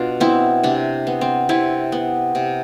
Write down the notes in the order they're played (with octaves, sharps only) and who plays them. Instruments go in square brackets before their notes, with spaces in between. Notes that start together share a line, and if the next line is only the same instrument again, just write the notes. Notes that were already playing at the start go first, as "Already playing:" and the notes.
Already playing: [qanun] B2 D4 F4
B3 C4 E4
C3 D4
B3
C4
C3 C4 E4
B3
C3